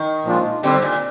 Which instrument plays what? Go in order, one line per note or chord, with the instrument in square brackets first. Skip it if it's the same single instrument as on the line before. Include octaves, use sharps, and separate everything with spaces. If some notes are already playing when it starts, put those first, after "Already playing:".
Already playing: [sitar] D#3
[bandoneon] A#2 F3 G#3 D4 F4
[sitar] D3 [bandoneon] G3 C4 G4
[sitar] A#2